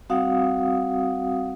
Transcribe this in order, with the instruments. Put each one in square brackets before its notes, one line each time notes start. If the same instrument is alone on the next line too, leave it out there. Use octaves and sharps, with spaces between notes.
[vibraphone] G3 C4 F#4 F5 F#5 D#6